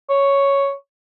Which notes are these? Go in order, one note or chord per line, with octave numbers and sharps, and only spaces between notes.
C#5